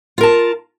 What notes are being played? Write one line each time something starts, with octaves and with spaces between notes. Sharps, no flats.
F4 A#4 A5